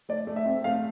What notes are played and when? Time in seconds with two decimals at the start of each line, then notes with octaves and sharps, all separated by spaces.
0.09 A3 D5
0.27 A3
0.36 E5
0.46 C4
0.64 A3 F5